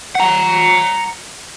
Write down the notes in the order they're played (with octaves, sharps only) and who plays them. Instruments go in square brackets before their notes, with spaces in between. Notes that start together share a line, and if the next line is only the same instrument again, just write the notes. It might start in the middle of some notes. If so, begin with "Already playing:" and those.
[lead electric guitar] F#5 A#5